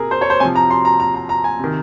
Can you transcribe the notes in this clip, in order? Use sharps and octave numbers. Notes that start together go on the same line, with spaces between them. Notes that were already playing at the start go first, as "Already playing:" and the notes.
Already playing: C3 G#4 A#4
C5
C#5
C5
C3 F3 G#5
A#5
C6
A#5
A#5
A#5
A#5
G#5
C3 D#3